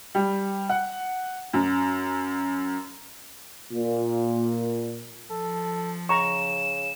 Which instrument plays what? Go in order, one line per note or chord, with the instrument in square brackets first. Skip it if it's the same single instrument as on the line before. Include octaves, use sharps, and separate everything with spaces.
[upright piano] G3
F#5
F#2
[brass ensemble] A#2
[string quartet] F3 [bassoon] A4
[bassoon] C#3 [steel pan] A#5 C#6 [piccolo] E7